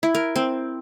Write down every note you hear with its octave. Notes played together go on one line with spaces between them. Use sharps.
E4
A#4
C4